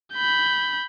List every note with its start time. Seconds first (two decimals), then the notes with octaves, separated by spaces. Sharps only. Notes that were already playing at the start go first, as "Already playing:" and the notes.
0.14 B5 G6